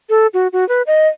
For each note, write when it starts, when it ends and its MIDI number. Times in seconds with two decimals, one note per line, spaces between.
0.10 0.27 69
0.34 0.48 66
0.53 0.67 66
0.69 0.82 71
0.87 1.08 75